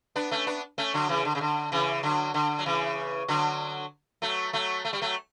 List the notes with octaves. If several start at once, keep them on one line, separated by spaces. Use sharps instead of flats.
B3 D4
A3 C#4
B3 D4
A3 C#4
D3 F#3
C#3 E3
D3
C#3
D3
C#3 E3
D3 F#3
D3
F#3
C#3 E3
D3 F#3
F#3 A3
F#3 A3
A3
G3
F#3 A3